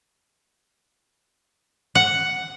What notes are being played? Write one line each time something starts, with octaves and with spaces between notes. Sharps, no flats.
F#5